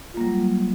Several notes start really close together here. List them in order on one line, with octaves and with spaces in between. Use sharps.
F4 A#3 G3 F#3